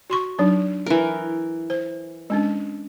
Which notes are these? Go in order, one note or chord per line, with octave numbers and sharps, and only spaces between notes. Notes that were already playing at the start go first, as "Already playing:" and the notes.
F#4 C6 C#6
F#3 D4 D#4
E3 A#4
C5
G#3 C#4 D4